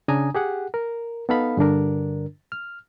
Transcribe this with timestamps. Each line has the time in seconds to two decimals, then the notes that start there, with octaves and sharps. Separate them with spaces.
0.08 C#3 D4 G#5 A#5 D#6
0.35 G4 G#4 F#5
0.74 A#4
1.29 B3 D#4 A4 F5 B5
1.57 G2 D3 D4 A#4
2.52 F6